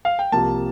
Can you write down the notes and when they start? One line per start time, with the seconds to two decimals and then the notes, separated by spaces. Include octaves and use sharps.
0.05 F5
0.19 G5
0.32 C2 C3 F3 A#3 A5